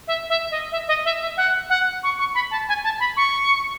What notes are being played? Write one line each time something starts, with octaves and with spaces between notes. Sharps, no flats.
E5
E5
D#5
E5
D#5
E5
E5
F#5
F#5
C#6
C#6
B5
A5
G#5
A5
B5
C#6